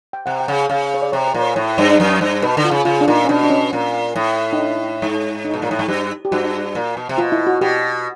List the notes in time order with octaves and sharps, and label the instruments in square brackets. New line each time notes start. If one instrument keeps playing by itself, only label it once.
[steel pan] G5
[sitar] C3 [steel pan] F#5
[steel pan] G5
[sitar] C#3 [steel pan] F#5
[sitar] C#3 [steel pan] F5
[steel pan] C#5
D5
[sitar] C3 [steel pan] C#5
[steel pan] C5
[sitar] A#2
[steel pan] C#5
[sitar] A2 [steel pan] C#5
[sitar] G2 [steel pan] C#5
[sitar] F#2
G2
[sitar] B2 [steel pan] B4
[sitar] D3
[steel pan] F4
[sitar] C#3
[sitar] C#3 [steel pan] F4
[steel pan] D4
[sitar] A#2 [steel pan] D#4
[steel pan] C#4
[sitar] B2 [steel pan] D4
[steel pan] D4
C#4
[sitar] A#2
A2
[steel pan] D#4
D4
[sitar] G#2
[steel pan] D#4
[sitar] B2
A#2
A2
G#2
[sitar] G2 [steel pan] G4
[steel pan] G4
[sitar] G2 [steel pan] F#4
[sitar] A#2
B2
C3
[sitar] B2 [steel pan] F4
[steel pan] E4
F#4
[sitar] B2 [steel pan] G4